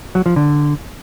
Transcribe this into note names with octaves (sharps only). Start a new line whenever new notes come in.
F#3
F3
D3